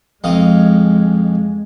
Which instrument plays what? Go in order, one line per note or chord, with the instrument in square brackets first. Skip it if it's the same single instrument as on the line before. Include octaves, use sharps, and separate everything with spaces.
[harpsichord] F2 D#5 F5 [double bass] G#3